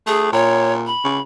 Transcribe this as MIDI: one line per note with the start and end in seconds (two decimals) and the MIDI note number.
0.07 0.28 57
0.07 0.31 68
0.33 0.92 46
0.33 0.73 73
0.87 1.22 83
1.04 1.20 49